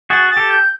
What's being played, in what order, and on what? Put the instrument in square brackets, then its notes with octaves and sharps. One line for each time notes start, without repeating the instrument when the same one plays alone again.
[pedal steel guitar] F#4 G#4 [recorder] A6
[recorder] A6
[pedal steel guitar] G4 A4
[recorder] G6